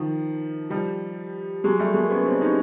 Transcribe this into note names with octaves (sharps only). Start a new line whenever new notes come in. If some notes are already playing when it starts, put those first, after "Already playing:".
Already playing: D#3 F3
F3 G3
F#3 G#3
G3 A3
G#3 A#3
B3 C#4
C4 D4
C#4 D#4